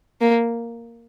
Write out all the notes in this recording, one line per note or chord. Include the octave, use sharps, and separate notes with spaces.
A#3